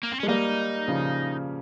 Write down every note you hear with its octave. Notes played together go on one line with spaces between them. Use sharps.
A#3
C4
C#4
G#3
G3 A#3 D#4
C#3 F3